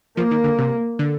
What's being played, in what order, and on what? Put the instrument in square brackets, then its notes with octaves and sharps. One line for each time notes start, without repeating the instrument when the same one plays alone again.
[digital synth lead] F3 [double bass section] A#3
[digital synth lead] D#3
D3
C3
D3